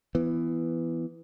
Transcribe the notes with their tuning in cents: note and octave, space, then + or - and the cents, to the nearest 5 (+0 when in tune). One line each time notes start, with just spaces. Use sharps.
E3 +10 B3 +10